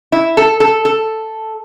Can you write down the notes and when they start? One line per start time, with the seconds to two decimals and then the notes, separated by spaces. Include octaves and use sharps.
0.12 E4
0.37 A4
0.60 A4
0.85 A4